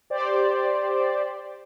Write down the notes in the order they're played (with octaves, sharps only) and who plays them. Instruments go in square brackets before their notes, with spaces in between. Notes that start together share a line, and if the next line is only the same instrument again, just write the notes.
[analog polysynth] G4 C5 D5